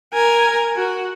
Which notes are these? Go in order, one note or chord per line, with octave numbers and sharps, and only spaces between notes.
A#4 G#5
F#4